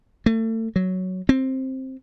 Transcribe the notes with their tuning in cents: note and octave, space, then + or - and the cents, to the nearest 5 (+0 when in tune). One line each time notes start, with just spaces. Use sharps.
A3 +35
F#3 +5
C4 +10